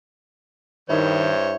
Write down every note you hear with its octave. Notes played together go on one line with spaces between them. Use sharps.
G2 D#3 E4 C5 C#5